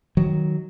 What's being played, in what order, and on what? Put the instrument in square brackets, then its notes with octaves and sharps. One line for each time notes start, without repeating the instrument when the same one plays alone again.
[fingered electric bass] D#3 F#3